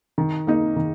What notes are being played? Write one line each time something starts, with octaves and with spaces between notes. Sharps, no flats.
D#3
A#3 D#4
D#3